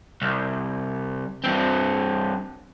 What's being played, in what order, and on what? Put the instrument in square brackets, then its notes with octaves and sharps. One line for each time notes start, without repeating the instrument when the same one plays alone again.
[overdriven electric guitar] C2
G2 C4